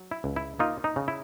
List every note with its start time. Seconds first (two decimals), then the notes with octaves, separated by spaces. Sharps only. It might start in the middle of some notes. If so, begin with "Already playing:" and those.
Already playing: F#3
0.11 E4
0.24 C#2
0.36 E4
0.59 A#3 D#4 F4
0.84 D#4
0.96 C#3
1.08 E4